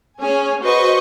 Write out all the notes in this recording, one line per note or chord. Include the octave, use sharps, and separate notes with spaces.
C#4 G#4 C#5 G#5
F#4 B4 C5 D#5 C#6